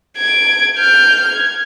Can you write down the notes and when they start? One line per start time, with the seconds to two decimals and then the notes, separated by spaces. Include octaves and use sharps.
0.17 G#6 D7
0.78 F6 G6
1.32 G#6